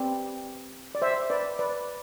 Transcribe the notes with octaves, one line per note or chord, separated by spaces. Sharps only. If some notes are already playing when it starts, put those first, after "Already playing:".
Already playing: C4 G4 B4 D5
D5
C5 E5
B4 D5
B4 D5